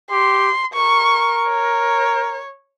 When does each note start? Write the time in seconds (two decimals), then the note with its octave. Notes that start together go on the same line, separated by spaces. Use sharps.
0.11 G4 C6
0.74 A#4 C#6
1.49 C#5